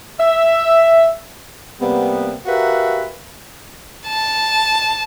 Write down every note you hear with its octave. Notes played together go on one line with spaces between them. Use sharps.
E5
C3 G3 A#3 B3
F#4 G4 A#4 B4 E5 F5
A5